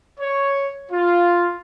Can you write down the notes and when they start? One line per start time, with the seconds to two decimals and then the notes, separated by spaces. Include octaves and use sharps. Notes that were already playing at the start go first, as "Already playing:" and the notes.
0.20 C#5
0.91 F4